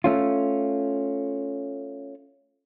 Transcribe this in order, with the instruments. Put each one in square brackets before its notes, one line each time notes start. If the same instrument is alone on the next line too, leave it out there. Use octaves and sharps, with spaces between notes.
[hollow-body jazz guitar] A3 C#4 F4